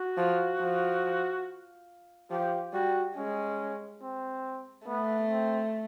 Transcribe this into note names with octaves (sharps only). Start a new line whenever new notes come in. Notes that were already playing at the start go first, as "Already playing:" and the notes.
Already playing: F#4
F3
F3
F3 G4
G3 F#4
G#3 C#4
C4
A3 B3
C4